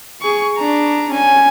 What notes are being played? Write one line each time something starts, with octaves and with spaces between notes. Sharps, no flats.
G#4 C#6
D4 A#5
C#4 G#5